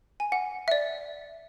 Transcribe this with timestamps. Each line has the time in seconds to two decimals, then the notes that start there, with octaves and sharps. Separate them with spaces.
0.20 G#5
0.32 F#5
0.68 E5
0.71 D5